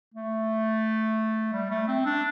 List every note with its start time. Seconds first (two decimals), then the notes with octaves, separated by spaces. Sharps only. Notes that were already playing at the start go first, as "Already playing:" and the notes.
0.14 A3
1.53 G3
1.71 A3
1.88 C4
2.06 D4